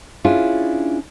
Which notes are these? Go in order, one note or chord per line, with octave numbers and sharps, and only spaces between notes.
C#4 D4 E4 F4 G#4 D5